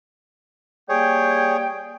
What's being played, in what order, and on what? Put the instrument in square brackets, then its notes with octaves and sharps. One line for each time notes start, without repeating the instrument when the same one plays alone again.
[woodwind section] G3 A#3 G5 [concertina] G#4 C#5